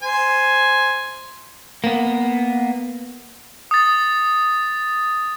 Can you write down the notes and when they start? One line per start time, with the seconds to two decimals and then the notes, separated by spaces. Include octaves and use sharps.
0.02 C5 G#5
1.84 A#3 B3
3.71 D#6 A6